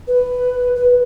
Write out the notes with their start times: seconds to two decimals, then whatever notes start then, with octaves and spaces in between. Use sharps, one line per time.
0.07 B4
0.76 B4